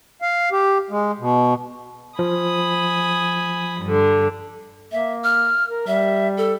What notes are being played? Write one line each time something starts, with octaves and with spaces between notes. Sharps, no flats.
F5
G4
G#3
B2
F3 G#5 B5 D#6
G2 D3
A#3 E5
F6
A#4
G3 E5
A4